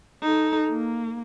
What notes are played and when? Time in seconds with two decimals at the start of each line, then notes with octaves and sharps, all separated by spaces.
0.22 D#4 A4
0.70 A#3